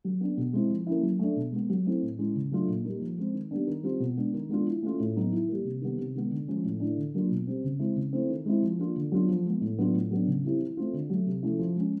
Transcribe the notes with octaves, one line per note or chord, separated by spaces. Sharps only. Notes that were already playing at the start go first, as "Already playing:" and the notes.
F#3
B3 D4
B2
G#3 C4 E4
F3
A#3 C#4 E4
F#3
A3 D4
B2
G#3 B3
F#3
A3 C4 E4
A2
E3 G#3 C#4
C#3
F#3 A3 D4 F4
A#2
G3 A#3 D#4
F3
G#3 C4
D#3
G3 B3 D4
D#3
G3 C4 F4
B2
G#3 B3 D4
D#3
G#3 B3 D4 F4
E3
A3 C#4 F4
A2
F#3 B3 D#4
E3
G3 A#3
C3
D#3 G3 B3
C3
D#3 G#3 B3
D3
F3 G#3 C#4
A2
E3 A3 D4
D3
F#3 A#3 D4 F4
B2
G3 C4
C#3
E3 G#3 C4 E4
C#3
E3 A3 C4
D#3
G#3 C4 E4
F3
A#3 D4 F4
D3
F#3 B3 D4 F4
F3
G#3 B3
A2
F#3 B3 D4 F4
A2
F#3 B3 D4
C#3
E3 G3 C4 E4
E3
A3 C4 F4
D3
F#3 A3
C3
F3 A3 C#4 E4
F3
G#3 C#4